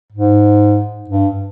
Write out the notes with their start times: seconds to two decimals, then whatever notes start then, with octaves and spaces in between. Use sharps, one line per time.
0.12 G#2
1.10 G2